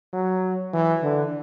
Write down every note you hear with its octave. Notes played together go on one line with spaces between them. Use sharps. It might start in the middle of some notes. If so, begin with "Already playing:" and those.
F#3
E3
D3